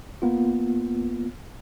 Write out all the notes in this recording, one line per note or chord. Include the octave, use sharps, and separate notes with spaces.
A#3 B3 F4